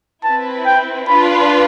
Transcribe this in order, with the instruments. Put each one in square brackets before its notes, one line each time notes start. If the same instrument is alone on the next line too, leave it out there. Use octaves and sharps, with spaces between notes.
[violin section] C4 E4 B4 [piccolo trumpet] A5
[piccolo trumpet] G5
[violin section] D4 F4 B4 [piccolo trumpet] B5